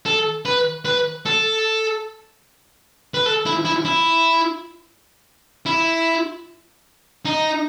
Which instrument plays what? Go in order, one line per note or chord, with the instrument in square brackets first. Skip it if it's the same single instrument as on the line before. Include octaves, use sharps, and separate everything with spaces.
[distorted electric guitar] A4
B4
B4
A4
B4
A4
E4
E4
E4
E4
D#4